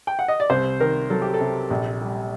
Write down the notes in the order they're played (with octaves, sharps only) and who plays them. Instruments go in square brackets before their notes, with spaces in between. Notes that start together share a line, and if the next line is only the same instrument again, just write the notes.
[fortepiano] G5
F#5
D#5
D5
C2 C5
D#3 A#4
F#3 A4
G4
A4
C3
A#1
G3